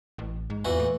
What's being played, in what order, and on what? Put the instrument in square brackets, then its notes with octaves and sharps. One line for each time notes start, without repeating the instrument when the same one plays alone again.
[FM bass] A1
G#2
[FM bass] E2 [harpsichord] A#2 E3 F#4
[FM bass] A2